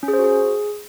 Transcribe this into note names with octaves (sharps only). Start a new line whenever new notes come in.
C#4
G#4
C5
F#4
G#4